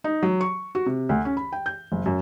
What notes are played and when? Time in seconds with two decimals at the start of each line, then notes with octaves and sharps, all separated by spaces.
0.04 D#4
0.23 F#3
0.41 C#6
0.75 F#4
0.86 C3
1.09 D2
1.25 C#4
1.37 B5
1.53 G5
1.66 G6
1.92 F#1
2.06 F#2